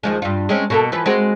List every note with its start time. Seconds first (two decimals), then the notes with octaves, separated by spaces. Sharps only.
0.03 D#2 F3 G#3
0.22 G2 F4
0.49 G#3 C4 C#4
0.70 B2 A#3 A4
0.92 E3 F3 B4
1.06 G#3 C4 F#4